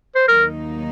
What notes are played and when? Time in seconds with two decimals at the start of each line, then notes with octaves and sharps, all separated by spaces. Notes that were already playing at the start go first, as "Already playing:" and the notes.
0.15 C5
0.28 D#2 D#3 F#3 A#3 D#4 A#4